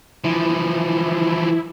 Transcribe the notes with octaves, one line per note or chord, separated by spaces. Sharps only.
E3 F3 E4